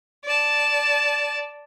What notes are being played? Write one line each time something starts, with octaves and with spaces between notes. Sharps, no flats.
D5 A5